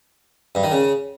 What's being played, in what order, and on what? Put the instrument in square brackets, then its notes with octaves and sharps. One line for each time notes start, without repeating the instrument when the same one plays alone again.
[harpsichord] G2
D#3
C#3